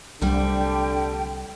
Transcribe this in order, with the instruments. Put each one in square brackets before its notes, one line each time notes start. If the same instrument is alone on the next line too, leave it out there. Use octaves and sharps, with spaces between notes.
[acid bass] C2 [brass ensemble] D3 [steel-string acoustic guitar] G3 A3 [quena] G5